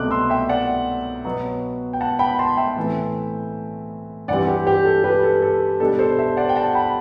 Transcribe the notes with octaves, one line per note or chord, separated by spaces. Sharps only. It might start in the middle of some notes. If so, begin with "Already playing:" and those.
Already playing: C2 B2 F#3 A3 C4 D6 F#6
C6 E6
E5 G5
D5 F#5
B2 F#3 B3
G5
F#5 A5
G5 B5
A5 C6
E5 G5
A2 E3 A3 C4
G2 E3 G3 C4 D5 F#5
G4
G4
A4
G4 B4
A4
A4
B2 G3 D4 A4
A4 C5
C5 E5
D5 F#5
G5
F#5 A5
G5 B5